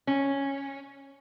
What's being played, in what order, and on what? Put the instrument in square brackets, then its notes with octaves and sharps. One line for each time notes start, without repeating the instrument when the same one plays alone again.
[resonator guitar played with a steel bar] C#4